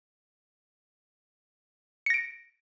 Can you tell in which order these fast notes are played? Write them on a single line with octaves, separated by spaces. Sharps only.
C#7 A#6 D7